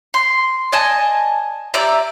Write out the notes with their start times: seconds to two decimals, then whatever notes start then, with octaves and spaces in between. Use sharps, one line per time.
0.14 C6
0.72 D5 D#5 G#5 A5
1.74 G4 D5 E5 A#5